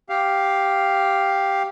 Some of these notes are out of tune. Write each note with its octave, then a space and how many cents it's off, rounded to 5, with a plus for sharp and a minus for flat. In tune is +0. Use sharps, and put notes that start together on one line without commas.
G4 +0 F5 +0